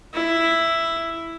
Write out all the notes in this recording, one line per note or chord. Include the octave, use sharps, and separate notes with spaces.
E4